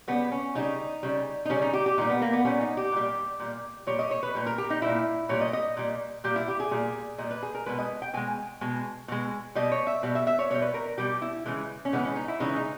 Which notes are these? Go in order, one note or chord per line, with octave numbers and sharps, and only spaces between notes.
C#3 G3 B3
C#4
C#3 G3 D#4
C#3 G3
D#4
C#3 G3 C#4
D#4
G4
G4
A#2 G3 D#4
B3
A#3
B3
A#2 G3 C#4
D#4
G4
A#2 G3
A#2 G3
A#2 G3 C#5
D#5
C#5
B4
A#2 G3
A#4
G4
D#4
A#2 G3 E4
A#2 G3 C#5
D#5
D#5
A#2 G3
A#2 G3 G4
E4
G4
G#4
A#2 G3
A#2 G3 D#5
B4
G#4
A#4
B2 G#3 B4
D#5
G5
B2 G#3 G#5
B2 G#3
B2 G#3
B2 G3 D#5
C#5
E5
B2 G3
E5
E5
C#5
B2 G3 C#5
B4
A#4
B2 G3 G4
E4
C#3 E3 G#3
C#4
C#3 E3 G#3 B3
C#4
D#4
E4
C#3 E3 G#3 D#4
D#4